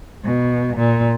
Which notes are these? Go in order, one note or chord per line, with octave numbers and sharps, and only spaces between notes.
B2
A#2